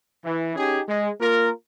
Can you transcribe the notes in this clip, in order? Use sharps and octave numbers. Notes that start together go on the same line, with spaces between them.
E3
C#4 D#4 G4 G#4
G#3
A#3 F4 A#4